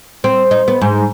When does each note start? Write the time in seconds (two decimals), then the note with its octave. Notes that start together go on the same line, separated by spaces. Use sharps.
0.24 C4
0.51 D#4
0.68 B3
0.81 G#2